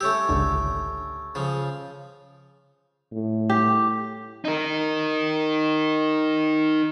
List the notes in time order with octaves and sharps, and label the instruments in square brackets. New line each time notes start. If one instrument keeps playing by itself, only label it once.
[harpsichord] A3 C#4 G4 [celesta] C#6 E6
[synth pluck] G#1 C#2 D3
[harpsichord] C#3 F3
[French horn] A2
[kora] G4
[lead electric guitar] D#4 A#4